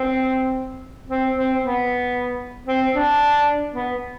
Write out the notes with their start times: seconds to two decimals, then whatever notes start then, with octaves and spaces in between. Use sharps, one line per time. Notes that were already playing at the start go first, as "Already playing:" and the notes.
Already playing: C4
1.09 C4
1.35 C4
1.63 B3
2.68 C4
2.95 D4
3.74 B3